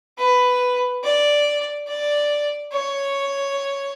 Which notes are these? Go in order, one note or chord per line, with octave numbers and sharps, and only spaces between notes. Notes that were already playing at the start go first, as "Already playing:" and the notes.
B4
D5
D5
C#5